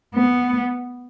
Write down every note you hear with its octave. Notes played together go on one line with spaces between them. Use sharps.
B3